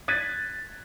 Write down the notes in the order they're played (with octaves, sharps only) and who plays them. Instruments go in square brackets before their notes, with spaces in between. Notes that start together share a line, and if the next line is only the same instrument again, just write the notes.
[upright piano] F#6 G#6 A6 B6 D#7